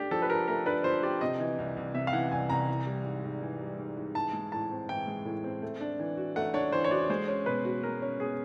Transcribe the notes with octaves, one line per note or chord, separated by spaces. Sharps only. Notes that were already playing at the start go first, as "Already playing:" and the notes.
Already playing: A3 D4 G4
F3 A4
B4
G4 A#4
A3 A#4
D4 B4
F3 C5
G4 D5
C3 D#5
E3
C2
C2
C3 E5
F5
E3 F#5
C2 G#5
C2 A#5
E3
G3
G#2
G#2
E3
G3
G#2
G#2
E3 A5
G#3
A2 A5
C4
E3 G5
G#3
A2
C4
A3
D4
E3
F#4
A3 F#5
D4 C#5
E3 C5
C#5
F#4 D5
G#3 C5
C#4
B2 B4
F#4
G#3 A#4
C#4
B2 G#4